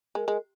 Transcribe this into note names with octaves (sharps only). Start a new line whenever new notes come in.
G#3 A#4
G#3